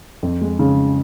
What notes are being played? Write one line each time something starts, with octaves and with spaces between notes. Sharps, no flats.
F2
G#3
C#3